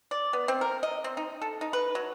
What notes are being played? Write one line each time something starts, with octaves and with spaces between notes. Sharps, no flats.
D5
B3
C4
A#4
D#5
C4
D#4
A4
D#4
B4
F#3